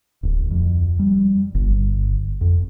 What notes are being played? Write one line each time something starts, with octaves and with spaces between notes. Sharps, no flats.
D1
F2
G3
G1
F2